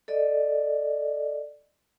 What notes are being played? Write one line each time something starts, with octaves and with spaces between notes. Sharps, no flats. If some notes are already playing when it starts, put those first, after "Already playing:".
A4 D5 D#5